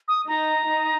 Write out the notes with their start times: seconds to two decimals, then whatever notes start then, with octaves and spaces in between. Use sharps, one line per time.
0.08 D#6
0.28 D#4 A#5
0.66 D#4